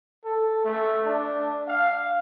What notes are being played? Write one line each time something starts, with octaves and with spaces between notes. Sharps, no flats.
A4
A3
D4
F5